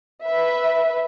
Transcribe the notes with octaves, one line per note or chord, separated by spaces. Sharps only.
B4 E5